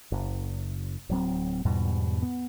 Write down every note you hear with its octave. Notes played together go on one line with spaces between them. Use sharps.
F#1
D1 F#3 C4
E2 G#2 B2 G3
B3